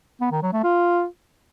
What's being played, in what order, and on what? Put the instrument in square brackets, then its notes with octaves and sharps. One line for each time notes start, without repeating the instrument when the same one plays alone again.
[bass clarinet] B3
D#3
F#3
A3
F4